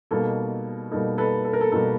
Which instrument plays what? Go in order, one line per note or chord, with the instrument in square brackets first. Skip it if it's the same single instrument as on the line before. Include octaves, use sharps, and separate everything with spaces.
[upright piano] B2 G3 A#3 D#4 A4
B2 G3 A#3 D#4 A4
A4 B4
A4
A#4
A4
B2 G3 A#3 D#4 A4